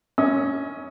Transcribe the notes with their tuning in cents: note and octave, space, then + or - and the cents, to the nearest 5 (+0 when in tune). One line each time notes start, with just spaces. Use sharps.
C#4 +10 D#5 +45